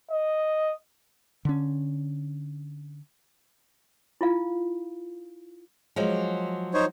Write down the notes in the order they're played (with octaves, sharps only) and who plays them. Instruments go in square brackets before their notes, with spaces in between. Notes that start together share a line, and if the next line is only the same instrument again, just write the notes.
[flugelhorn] D#5
[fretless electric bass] D3 C#4
[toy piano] E4 F4 F5
[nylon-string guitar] F3 F#3 G#3
[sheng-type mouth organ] D#4 C5 C#5